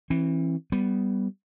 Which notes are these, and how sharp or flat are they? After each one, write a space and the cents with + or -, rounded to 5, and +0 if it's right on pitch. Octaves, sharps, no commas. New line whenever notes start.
E3 +0 C4 +45
G3 -5 B3 +5